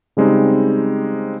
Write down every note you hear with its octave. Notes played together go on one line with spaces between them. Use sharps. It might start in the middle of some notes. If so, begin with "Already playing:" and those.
C#3 G3 G#3 C4 D#4